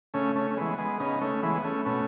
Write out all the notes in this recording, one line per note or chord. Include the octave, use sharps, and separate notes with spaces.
C#3 A3 C#4
A3 C#4
C#4
E3 G#3 B3
G#3 B3
C#3 B3 D#4
A3 C#4
E3 G#3 B3
A3 C#4
B2 A3 C#4